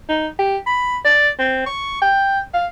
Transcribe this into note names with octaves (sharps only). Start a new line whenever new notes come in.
D#4
G4
B5
D5
C4
C#6
G5
F5